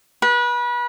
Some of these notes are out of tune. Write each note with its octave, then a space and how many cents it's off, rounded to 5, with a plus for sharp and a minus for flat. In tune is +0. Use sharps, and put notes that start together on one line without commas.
B4 -30